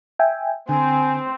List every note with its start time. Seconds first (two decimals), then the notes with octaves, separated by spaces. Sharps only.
0.19 E5 G5 G#5
0.69 D3 C4 G#5